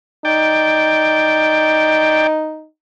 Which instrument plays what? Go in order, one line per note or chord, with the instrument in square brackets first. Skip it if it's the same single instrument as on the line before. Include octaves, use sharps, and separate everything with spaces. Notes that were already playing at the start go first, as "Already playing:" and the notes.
[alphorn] D#4 [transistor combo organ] D5 G5